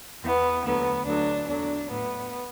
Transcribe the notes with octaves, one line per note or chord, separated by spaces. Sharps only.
E2 E3 B3
D2 D3 F#3 B3
D2 D3 F#3 D4
E2 D3 F#3 D4
A2 F#3 B3